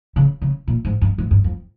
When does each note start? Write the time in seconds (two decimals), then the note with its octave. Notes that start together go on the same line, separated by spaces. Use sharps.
0.16 C#3
0.42 C#3
0.67 A#2
0.85 G#2
1.01 G2
1.18 G#2
1.31 G2
1.44 F2